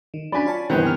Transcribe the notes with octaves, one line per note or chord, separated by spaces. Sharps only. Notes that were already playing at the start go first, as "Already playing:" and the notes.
D#3
F#3 C#4 D4 D5 G#5 B5 B6
F4 C#5 A5
G1 C2 D#3 E3 B3 C4 G5 G#5
G#5 F6